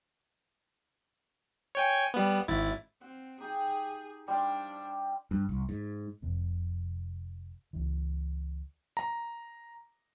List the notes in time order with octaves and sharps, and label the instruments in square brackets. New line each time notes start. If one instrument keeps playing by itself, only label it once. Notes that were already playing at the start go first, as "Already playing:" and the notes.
[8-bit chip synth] C#5 G5 G#5
G3 B3
G#1 E4 A6
[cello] C4 [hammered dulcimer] F#5
[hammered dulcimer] D#4 G4 [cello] G#4
[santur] G3 [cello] D4 [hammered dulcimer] C5 F5
[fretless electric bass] G2
C2
G#2
[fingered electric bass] F1 F2 C3
C#2 E3
[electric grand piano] A#5